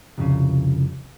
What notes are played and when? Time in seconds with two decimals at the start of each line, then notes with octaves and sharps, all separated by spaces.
0.18 C2 F2 A#2 C#3